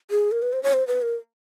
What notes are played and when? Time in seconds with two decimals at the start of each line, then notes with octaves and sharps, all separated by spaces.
0.10 G#4
0.32 A#4
0.42 B4
0.53 C5
0.63 C#5
0.73 C5
0.87 B4
1.02 A#4